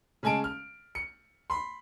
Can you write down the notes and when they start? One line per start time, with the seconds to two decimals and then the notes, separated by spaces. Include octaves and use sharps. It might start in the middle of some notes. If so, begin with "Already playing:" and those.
0.23 C#3 G#3 G#5 A5 D7
0.44 F6
0.95 C#7
1.50 B5 C6